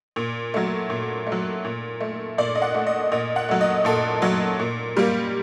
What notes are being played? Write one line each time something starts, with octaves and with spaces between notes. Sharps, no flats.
A#2
F#3 A3
A#2
A3
F#3
A#2
A3
A#2 D5
D#5
F#5
A3
D#5
A#2 D#5
F#5
F#3 A3
D#5
A#2 A4
F#3 A3
A#2
G3 A#3